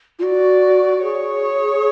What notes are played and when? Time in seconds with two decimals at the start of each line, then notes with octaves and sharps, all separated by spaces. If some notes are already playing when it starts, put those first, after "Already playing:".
0.19 F4
0.23 F#4 D5
1.02 G#4 C#5